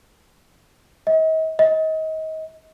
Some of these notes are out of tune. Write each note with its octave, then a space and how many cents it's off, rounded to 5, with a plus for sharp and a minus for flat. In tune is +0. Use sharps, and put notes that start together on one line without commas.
D#5 +40
D#5 +30